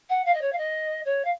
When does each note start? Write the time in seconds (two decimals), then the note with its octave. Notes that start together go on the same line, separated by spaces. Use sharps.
0.09 F#5
0.25 F5
0.33 D#5
0.41 C#5
0.52 F5
0.57 D#5
1.05 C#5
1.24 F5